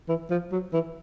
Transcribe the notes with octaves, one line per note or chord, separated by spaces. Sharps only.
E3
F3
F#3
E3